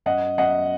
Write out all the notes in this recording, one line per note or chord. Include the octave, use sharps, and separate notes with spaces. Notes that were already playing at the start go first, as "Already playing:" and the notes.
F#2 D#5 F#5
F#2 D#5 F#5